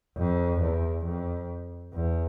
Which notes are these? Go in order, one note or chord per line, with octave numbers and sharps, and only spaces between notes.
F2
E2
F2
E2